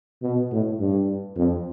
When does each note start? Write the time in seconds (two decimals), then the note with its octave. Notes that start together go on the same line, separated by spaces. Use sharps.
0.23 B2
0.51 A2
0.80 G2
1.36 F2